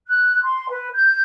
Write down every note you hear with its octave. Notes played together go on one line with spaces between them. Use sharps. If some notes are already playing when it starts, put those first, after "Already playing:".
F#6
C6
B4
G6